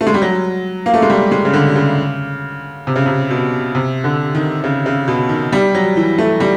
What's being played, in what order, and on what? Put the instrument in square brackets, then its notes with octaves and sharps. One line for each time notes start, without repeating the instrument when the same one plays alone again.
[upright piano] A3
G#3
G3
F#3
A#3
A3
G#3
G3
G#3
C#3
D3
C#3
C3
C#3
C3
B2
C3
D3
D#3
C#3
C#3
B2
D#3
G3
F#3
E3
A3
G3